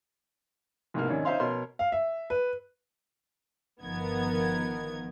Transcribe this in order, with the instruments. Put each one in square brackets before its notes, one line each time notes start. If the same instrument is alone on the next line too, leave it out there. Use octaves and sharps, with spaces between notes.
[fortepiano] C2 G#2 B2 A#3 F6
G#1 D#3 C#4 D5
C#4 D#4 C5 E5 F5 C6
B2 A#4 C#5 C6
[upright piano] F5
E5
B4
[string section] G1 D#3 F3 B3 A#4 G#6